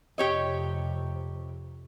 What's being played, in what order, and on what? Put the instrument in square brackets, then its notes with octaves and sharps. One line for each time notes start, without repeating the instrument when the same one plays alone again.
[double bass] F2 C3 [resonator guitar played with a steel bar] G4 C#5 D#5